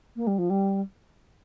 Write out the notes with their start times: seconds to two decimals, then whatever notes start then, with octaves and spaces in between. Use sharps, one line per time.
0.16 A#3
0.27 G3
0.38 F3
0.50 G3